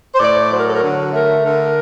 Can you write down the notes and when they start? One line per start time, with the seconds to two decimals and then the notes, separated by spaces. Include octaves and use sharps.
0.14 C5
0.19 A2 D5
0.50 F#3 C5
0.58 A#4
0.66 A4
0.73 A#4
0.81 D3
1.12 A3 A#4
1.42 D3 A#4